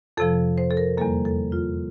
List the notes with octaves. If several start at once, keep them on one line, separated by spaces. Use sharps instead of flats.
F2 C3 F3 A4
C5
A4
A#4
E2 D3 G3 A#3 A4
A4
F4